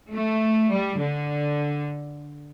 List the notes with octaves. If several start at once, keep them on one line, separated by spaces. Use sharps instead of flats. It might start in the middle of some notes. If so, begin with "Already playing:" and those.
A3
G3
D3